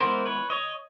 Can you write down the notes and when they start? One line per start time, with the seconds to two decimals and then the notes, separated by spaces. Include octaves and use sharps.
0.01 E3 G#3 B3 A#4 C5
0.26 B4 C#5
0.50 C#5 D#5